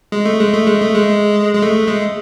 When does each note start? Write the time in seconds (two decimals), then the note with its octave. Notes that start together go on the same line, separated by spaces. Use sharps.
0.12 G#3
0.25 A3
0.40 G#3
0.53 A3
0.67 G#3
0.81 A3
0.95 G#3
1.54 G#3
1.63 A3
1.88 G#3